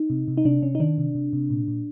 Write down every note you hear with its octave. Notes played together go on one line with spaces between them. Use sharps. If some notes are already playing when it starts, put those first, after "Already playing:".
Already playing: D#4
C3
C3
D#4
C3 D4
C3 C#4
D#4
D#3 D4
C3
C3
C3
A#2
A#2